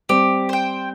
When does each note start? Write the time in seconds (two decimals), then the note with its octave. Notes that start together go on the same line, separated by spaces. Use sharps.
0.09 G3 C4 G4
0.49 C5 G5